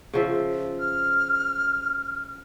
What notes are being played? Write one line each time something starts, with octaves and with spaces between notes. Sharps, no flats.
C#3 F3 E5
F6